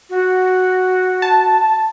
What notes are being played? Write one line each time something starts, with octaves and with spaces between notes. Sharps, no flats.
F#4
A5